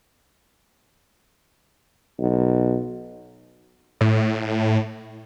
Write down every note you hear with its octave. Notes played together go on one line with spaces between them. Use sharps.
B1
A2